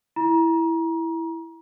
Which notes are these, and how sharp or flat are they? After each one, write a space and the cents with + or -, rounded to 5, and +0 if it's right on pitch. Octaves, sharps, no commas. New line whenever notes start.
E4 +0 A#5 +30